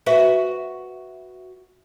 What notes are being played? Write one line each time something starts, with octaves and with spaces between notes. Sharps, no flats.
F#4 B4 E5